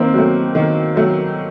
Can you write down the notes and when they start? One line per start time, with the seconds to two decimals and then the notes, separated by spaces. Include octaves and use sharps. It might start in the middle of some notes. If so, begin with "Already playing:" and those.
Already playing: D#3 A#3 C4
0.14 F#3 A3
0.55 D#3
0.96 F#3 A3